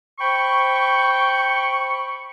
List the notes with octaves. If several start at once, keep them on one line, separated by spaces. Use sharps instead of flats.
C5 G5 B5 C#6